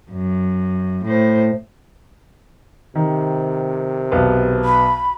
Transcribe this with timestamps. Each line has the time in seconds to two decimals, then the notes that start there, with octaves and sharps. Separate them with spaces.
0.11 F#2
1.04 A2 C5
2.95 C3 D#3
4.12 B1 B3
4.65 B5